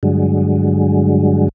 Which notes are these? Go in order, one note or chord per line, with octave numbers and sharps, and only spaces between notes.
G2 D3 F#3 G#3